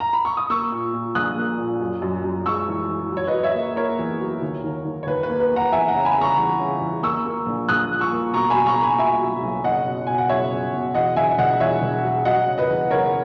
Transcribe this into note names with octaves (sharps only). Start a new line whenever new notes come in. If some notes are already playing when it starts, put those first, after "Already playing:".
A#5
B5
C#6
D#6
A#3 C#6 E6
A#2
A#2
A#1 D#6 F#6
A#3
A#2
F#2
F#2
F#2
G#3 C#6 E6
E3
E3
F#3
C#5
B4 D#5
F#3
C#5 E5
A#3
A#3 A#4 C#5
E2
F#3
D#2
D#2
D#2
C#5
D#2 B4
B4
A#3
B4
A#3
F#5 A#5
E2 E5 G#5
F#5 A#5
C#3
G#5 B5
C#3
A#5 C#6
E2
C#3
E2
A#3 C#6 E6
A#3
A#1
A#1 D#6 F#6
A#2
C#6 E6
A#3
B2 A#5 C#6
G#5 B5
F#3
A#5 C#6
A#3
G#5 B5
B2 E5 G#5
F#3
B1
F#1 D#5 F#5
B2
B2 G#5
F#5
F#1 C#5 E5
F#1
B2
E2 D#5 F#5
E1 E5 G#5
E1 D#5 F#5
E2 C#5 E5
E1
F#3
F#3 D#5 F#5
C#3
B4 D#5
E2
F#1 A#4 C#5